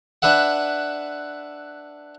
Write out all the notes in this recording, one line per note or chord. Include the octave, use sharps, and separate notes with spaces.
D4 B4 E5 F#5